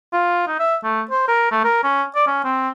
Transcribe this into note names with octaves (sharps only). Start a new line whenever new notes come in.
F4
D#4
E5
A3
C5
A#4
A3
A#4
C#4
D5
C#4
C4